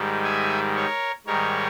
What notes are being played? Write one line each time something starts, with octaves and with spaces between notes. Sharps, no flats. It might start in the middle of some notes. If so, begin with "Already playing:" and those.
Already playing: G#2 D#3 G3
E5 G#5
A#4 C#5
G#2 D#3 G3 A#4 C#5